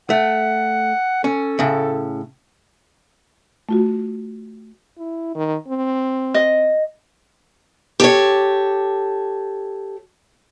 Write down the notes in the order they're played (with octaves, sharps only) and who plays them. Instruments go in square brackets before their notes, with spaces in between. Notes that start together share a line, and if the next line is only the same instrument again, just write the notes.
[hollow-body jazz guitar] A3 [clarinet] F#5
[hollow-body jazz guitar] C#4 [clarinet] A4
[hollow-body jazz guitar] A2 C#3
[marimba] A3 F4 F#4
[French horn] E4
D#3
C4
[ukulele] D#5
[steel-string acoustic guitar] G4 A4 C#5